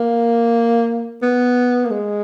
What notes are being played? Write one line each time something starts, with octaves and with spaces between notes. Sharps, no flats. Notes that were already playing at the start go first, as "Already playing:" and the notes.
Already playing: A#3
B3
A#3
G#3